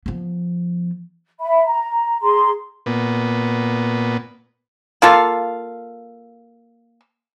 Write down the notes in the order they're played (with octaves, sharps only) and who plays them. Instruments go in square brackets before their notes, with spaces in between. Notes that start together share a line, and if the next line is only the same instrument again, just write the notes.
[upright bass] F3 B3
[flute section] E5 B5
A#5
G#4 A#5 C6
[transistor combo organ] A#2 B3
[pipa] A#3 F4 A4 F5